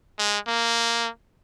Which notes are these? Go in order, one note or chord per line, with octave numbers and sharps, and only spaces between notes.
G#3
A#3